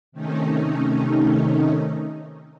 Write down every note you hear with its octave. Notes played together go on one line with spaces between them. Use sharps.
C3 D#3 A3 C#4 D#4